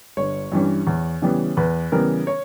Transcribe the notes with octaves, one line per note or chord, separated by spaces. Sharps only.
G1 C#5
G2 E3 G3 C#4
E2
C#3 E3 G3 B3
E2 B4
C#3 E3 G3 B3 A#4
C#5